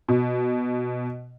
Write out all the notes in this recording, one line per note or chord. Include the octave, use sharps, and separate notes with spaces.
B2